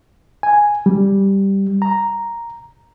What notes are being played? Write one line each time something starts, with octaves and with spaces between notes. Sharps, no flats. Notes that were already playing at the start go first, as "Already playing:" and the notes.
G#5
G3
A#5